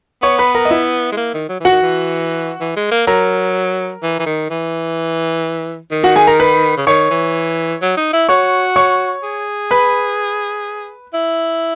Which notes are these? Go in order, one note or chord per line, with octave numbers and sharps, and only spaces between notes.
B3 C#5 C#6
B4 B5
A#4 A#5
D#5
E4 E5
G#3
A#3
D#3
F#3
E3 F#4 F#5
D#3
E3
E3
G#3
A#3
F#3 A#4 A#5
E3
E3
D#3
E3
D#3
F#4 F#5
G#4 G#5
A#4 A#5
B4 B5
C#3
D#3 C#5 C#6
E3
F#3
D#4
E4
F#4 C#5 C#6
C#5 C#6
G#4
B4 B5
E4